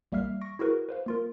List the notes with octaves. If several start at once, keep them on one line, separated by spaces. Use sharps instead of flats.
A1 G3 A#3 E5 F6 C7
C#6 A#6 D7
E4 F#4 G#4 A#4 B4
B4 C5 F5
A#3 F4 A#4